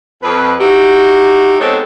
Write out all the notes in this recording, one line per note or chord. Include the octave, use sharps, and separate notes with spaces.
F2 B4
D#4 E4 F#4 G4
G#3 B3 C4 D#4 A4 C#5